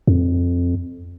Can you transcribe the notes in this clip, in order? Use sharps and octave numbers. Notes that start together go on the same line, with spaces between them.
F2